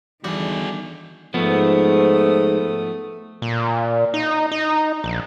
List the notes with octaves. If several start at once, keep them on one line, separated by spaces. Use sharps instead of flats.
E2 D3 D#3 G3 F#4 G#4
G#2 F3 A3 B3 D#6
A#2
D#4
D#4
A#1